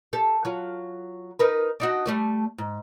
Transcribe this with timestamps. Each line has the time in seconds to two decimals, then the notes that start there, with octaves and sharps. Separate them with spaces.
0.13 G4 A4
0.45 F#3 F4
1.39 D#4 A#4 B4
1.80 D4 D#4 F#4
2.06 G3 A3 D5
2.58 G#2